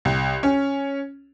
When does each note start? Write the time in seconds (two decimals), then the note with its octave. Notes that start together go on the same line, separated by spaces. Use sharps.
0.05 C2
0.43 C#4